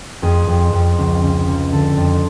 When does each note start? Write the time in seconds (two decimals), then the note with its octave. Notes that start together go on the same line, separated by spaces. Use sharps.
0.22 F2 G#4
0.47 F2
0.73 F2
0.98 C#2
1.23 C#2
1.47 C#2
1.72 D3 A4
1.97 F2